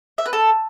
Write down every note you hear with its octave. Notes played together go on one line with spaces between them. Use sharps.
E5
B4
A4